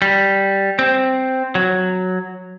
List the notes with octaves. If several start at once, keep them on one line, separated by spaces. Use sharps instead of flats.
G3
C4
F#3